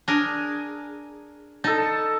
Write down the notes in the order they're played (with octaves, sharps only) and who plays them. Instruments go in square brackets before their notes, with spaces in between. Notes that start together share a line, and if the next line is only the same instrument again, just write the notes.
[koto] D4 G#4 A#4
[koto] D#4 [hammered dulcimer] A4 A5